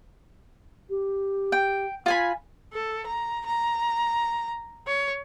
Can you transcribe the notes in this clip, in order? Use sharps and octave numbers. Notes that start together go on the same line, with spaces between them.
G4
G5
F4 G#5 B5
A4
A#5
A#5
C#5